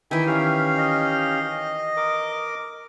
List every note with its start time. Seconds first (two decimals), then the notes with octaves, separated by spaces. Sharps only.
0.11 D#3 E3 E5 G5 G#5
0.27 C#4 G4 F5
0.78 D#5
1.97 A#4 D6